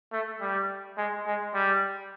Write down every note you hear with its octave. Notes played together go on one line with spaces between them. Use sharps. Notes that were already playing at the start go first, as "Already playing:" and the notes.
A3
G3
G#3
G#3
G3